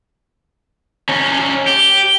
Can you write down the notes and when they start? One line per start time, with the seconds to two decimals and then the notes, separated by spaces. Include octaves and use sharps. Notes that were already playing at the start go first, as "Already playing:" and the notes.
1.09 C#4 D#4
1.67 G4